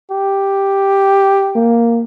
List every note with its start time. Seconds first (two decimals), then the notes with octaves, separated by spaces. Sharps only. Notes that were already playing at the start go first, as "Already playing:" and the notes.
0.10 G4
1.55 A#3